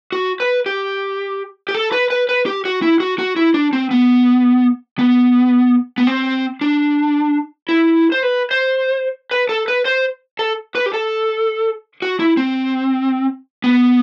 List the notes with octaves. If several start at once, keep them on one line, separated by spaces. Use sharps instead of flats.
F#4
B4
G4
G4
A4
B4
B4
B4
G4
F#4
E4
F#4
F#4
E4
D4
C4
B3
B3
B3
C4
D4
E4
C5
B4
C5
B4
A4
B4
C5
A4
B4
G4
A4
F#4
E4
C4
B3